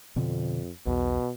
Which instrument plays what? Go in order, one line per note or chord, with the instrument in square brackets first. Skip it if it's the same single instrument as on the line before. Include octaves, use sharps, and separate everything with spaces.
[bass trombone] F2 [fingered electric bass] B2 D3 C4
[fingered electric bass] B1 E2 [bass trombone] B2